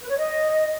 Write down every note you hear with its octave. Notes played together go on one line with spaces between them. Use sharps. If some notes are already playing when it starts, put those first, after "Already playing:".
B4
C#5
D#5